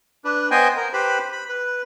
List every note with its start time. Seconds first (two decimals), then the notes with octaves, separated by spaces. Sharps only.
0.25 D4 B4
0.51 B3 C5 D#5 G5 G#5
0.76 A#4
0.93 G4 B4 C5 B5
1.32 B5
1.49 B4